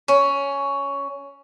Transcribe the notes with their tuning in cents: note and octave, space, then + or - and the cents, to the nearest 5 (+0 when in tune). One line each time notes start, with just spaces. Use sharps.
C#4 +10